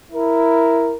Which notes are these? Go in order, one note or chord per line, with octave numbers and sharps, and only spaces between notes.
E4 A#4